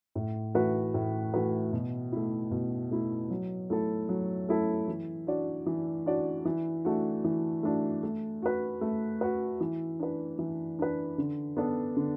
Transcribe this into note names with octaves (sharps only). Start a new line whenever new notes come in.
A2
E3 A3 F#4 B4
A2
E3 A3 F#4 B4
B2
A3 E4
B2
A3 E4
F#3
A3 E4 A4
F#3
A3 E4 A4
E3
D4 F#4 D5
E3
D4 F#4 D5
E3
A3 D4 F#4
E3
A3 D4 F#4
A3
F#4 B4
A3
F#4 B4
E3
D4 B4
E3
D4 B4
D3
B3 D4 A4 D5
D3